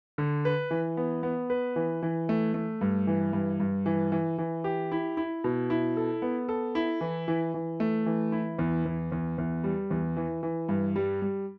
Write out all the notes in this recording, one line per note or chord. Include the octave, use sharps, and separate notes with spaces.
D3
B4
E3
B3
B3
B4
E3
E3
A3
A3
G2
E3
G2
G2
E3
E3
E3
G4
E4
E4
B2
E4
A4
B3
A4
E4
E3
E3
E3
A3
E3
E4
E2
E2
E2
E2
G3
E2
E3
E3
G2
G3
G3